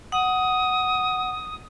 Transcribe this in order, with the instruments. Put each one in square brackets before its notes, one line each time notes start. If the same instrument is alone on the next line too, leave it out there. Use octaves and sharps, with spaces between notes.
[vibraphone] F#5 [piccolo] D#6